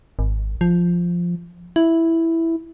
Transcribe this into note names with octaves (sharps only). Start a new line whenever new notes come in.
G#1
F3
E4